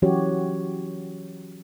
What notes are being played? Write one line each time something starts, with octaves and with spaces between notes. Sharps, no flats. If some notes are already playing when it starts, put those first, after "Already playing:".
E3 F#3 C#4 F#4 G4 C#5